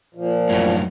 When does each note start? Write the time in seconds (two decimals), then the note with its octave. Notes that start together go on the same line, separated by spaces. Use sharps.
0.15 A#2 F3
0.49 F#2 A2